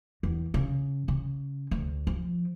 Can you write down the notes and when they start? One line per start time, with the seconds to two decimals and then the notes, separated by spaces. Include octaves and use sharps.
0.23 E2
0.54 C#3
1.08 C#3
1.71 D2
2.07 F3